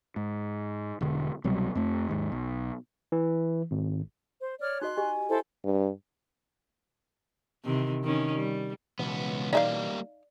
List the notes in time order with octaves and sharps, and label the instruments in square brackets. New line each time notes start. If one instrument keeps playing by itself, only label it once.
[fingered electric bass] G#2
E1 D3
C2 B2 F#3 G3
F2 A3
D#2 G#2
B1
[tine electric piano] E3
G#1
[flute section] C5
C#5 D5 F6
[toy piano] D#4 F#4 D#5 [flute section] C6 F#6
[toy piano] G4 D#5 [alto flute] G#5
[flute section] E4 A4 C5
[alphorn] G2
[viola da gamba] C3 D#3 E3
D#3 E3 C#4
G3
[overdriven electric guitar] C#2 B3 [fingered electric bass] B2 E3
[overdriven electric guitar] G3 A#3 [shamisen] D#4 E5 F5 [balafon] D5